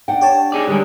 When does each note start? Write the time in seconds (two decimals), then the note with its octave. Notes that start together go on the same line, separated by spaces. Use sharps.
0.08 D4 F#5 G5
0.21 G4 C#5 A5
0.52 D#4 G#4 D5
0.67 D3 G3 G#3 A#4